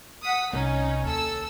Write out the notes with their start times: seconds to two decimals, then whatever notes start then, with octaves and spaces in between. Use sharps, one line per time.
0.23 F#5 D#6 B6
0.53 C2 C#4 D#4
1.04 D#2 A4 E6